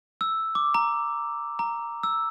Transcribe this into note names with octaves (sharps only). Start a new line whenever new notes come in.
E6
D6
A#5
A#5
E6